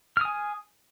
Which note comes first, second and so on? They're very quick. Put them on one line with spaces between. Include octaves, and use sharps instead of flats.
F6 D#6 G#5